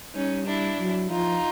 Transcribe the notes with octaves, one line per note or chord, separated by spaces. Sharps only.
G3 C#4 D#4
D4 E4
F#3
F3 D#4 F4